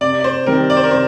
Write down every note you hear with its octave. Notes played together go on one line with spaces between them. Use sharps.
C3 D5
D5
C5
D#3 G3 C4 A#4
D5
C5
A#4
C3 C5